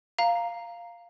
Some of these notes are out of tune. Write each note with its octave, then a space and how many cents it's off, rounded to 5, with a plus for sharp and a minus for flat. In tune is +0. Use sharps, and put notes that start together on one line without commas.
F5 +0 A#5 +0